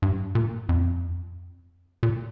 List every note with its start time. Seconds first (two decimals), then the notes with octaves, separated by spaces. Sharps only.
0.02 G2
0.35 A#2
0.69 F2
2.03 A#2